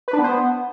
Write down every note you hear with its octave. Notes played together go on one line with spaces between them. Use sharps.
B4
D4
B3
C5
B3